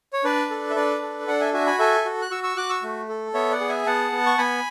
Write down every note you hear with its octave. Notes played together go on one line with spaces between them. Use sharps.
C#5
D4 B4 D5
A4
E5
D4 B4 D5
A4
D4 D5 F#5
E5 G#5
F#4 E5 G#5
G#5 B5
A4 E5 G#5
F#4
F#6
F#4 C#6 E6
C#6 E6
F#4 D6 F#6
C#6 E6
A3
A4
B3 C#5 E5
D5 F#5
G#4
E5 G#5
B3 F#5 A5
B3
C#6
B3 G#5 B5